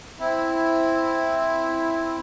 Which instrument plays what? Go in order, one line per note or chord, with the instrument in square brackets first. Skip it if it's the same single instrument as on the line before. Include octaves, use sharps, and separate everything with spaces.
[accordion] C4 E4